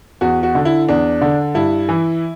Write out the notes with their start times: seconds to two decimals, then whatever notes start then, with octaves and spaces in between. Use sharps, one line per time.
0.21 E2 F#4
0.43 F#4
0.55 D3
0.65 E4
0.89 E2 D4
1.21 D3
1.55 G2 E4
1.89 E3